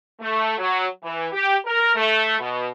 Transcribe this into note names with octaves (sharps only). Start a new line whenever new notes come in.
A3
F#3
E3
G4
A#4
A3
B2